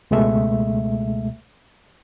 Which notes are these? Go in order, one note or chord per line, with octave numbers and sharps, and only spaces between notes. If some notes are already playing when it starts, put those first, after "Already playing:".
C#2 B2 G#3 A3 E5